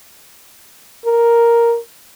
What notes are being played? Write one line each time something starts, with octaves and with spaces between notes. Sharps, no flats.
A#4